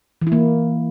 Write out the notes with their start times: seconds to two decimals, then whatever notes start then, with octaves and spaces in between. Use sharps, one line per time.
0.22 E3
0.27 E4
0.32 A#3